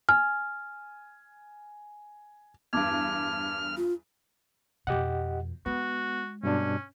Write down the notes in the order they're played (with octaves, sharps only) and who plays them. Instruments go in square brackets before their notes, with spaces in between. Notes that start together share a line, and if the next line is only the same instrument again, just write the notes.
[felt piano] G#5 [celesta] F6
[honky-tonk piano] E2 G2 [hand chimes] A5 D6 G#6 [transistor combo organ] F6
[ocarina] F4
[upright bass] F2 B2 [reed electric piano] G4 D#5 F#5
[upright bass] G#3 [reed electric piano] B3 [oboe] F#4
[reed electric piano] G2 B2 D4 [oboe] C#4